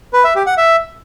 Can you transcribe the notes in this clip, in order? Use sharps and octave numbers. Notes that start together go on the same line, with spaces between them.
B4
E5
G4
F#5
E5